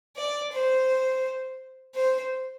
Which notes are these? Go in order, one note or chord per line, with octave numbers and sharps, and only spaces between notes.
D5
C5
C5